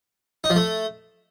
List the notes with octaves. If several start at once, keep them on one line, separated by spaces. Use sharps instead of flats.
D#4
F3
A3